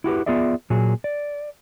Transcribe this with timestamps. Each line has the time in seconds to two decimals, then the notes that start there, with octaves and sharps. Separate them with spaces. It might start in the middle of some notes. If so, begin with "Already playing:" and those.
0.04 E4 F#4 G4 B4
0.26 B3 F4 G#4 D5 E5
0.70 A#2 F#3 G#4
1.04 D5